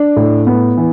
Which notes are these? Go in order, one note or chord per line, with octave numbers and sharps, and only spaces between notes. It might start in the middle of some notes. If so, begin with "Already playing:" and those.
Already playing: D4
A2
B3
E3